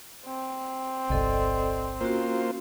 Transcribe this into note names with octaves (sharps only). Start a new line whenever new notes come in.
C4
G1 C2 A4 D5 D#5
A#3 C#4 F4 F#4 C5